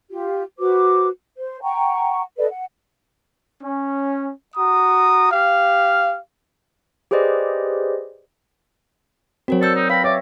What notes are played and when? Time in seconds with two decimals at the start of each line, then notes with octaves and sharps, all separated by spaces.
0.10 F4 G4
0.59 F#4 B4 C5 D6
1.37 C5
1.63 F#5 G5 A#5 C#6
2.38 A4 B4 D5 D#5
2.50 F#5
3.62 C#4
4.56 F#4 A#5 D#6
5.31 G4 F5
7.11 G4 G#4 B4 C5 D5 D#5
9.48 F#3 C4 F#4 A#4 C#5
9.62 A4 D5 E6 G6
9.75 D#4
9.90 B4 F5 G5 B5 A#6
10.04 C#5 D5 E5